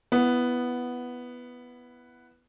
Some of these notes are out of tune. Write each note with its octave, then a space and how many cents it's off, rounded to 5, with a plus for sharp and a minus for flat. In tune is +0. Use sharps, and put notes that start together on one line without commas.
B3 +0 E4 +20